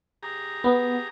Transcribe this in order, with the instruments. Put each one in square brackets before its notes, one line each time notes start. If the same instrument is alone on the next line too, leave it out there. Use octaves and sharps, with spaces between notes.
[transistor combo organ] G4 G#4 A#5
[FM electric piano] B3